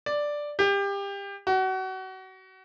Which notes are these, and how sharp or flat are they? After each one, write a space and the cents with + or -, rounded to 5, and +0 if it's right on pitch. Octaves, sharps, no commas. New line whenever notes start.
D5 +0
G4 +25
F#4 +30